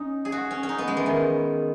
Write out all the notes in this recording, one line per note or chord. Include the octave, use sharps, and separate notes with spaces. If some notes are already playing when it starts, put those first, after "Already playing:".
Already playing: C#4 D#4
G#4
F#4
C#4
C#4
D#4
B3
G#3
E3
D#3